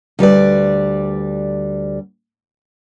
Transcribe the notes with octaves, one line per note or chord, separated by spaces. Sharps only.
D2 G3 B4 D5